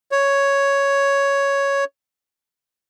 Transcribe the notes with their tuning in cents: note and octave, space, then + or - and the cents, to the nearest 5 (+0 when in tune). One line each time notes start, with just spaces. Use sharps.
C#5 +5